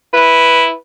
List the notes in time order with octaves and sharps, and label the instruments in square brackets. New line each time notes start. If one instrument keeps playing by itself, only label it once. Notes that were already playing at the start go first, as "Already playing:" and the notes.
[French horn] E4 [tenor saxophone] B4